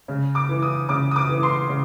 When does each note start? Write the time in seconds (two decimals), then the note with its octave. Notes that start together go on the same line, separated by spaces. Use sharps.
0.08 C#3
0.35 D6
0.49 E3
0.62 D#6
0.89 C#3 D6
1.11 D#6
1.16 D6
1.29 E3
1.43 C6
1.69 C#3